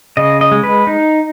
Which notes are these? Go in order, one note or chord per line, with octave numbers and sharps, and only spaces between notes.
C#3 D#5
D#5
G#3
B4
D#4